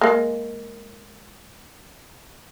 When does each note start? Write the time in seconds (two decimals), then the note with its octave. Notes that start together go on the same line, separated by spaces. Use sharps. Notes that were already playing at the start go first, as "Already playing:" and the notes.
0.01 G#3 A#3